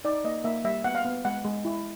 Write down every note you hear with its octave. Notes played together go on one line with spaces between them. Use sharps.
D#4 D5
A#3 D#5
A#3 E5
G3 E5
B3 F#5
F5
B3
G#3 F#5
G#3
E4